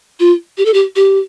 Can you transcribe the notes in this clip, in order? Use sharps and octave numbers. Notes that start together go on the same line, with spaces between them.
F4
G4
A4
G4
G4